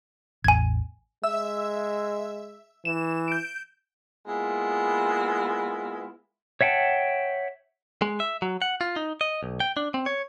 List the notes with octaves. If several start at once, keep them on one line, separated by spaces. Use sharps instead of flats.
A1 E2 G#5 G#6
G#3 E5 E6
E3 E7
G6 D7
G#3 A#3 B3 E4 F4
C#5 E5 F#5 G5 A5
G#3
E5
F#3
F#5
F4
D#4
D#5
B1
G5
D4
C4
C#5